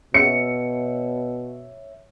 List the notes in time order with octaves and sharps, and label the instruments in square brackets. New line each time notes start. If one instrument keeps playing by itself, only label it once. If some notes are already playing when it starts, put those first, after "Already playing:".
[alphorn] B2 [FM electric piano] C#5 E5 [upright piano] C#7